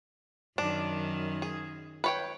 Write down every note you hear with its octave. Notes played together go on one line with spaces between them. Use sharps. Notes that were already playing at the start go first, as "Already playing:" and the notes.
F#2 D#3 D4
G#4
B4 C#5 G5